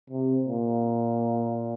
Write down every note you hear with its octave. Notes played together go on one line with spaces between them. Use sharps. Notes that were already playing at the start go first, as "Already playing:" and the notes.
C3
A#2